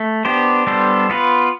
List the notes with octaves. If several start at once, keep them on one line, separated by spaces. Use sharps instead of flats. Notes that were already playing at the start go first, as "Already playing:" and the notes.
Already playing: A3
B3 D4 G4 C5
G3 B3 D4 A4 C5
B3 F4 B4